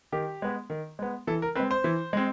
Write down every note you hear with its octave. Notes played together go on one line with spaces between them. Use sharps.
D#3 G4
G#3 B3
D#3
G#3 B3
E3 A4
A#4
G#3 C4 B4
C5
E3
G#3 C4